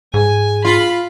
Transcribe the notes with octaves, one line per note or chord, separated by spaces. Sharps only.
G#2 G#4 G#5
F4 B5